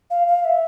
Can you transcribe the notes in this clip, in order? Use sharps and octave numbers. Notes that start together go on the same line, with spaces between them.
F5
F5
E5